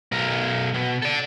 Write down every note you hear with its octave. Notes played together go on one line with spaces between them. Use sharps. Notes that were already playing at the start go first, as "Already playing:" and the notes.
B1 A#4
B2
A4 D5